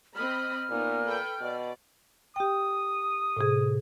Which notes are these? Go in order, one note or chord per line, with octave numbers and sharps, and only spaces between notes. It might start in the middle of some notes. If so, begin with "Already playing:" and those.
C4 D#5 B5 F6
A#2 B3 D#4
A4 B4 G5
B2 D5
G4 G5 D#6
A2 C3 G#4